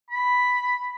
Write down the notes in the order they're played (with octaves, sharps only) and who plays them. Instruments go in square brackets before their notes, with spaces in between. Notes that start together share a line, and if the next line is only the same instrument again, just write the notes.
[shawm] B5